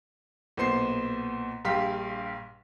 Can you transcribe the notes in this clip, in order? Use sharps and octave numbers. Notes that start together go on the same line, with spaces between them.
B1 A#2 B3 C5 C6 C7
A#1 G2 G4 F5 C6 B6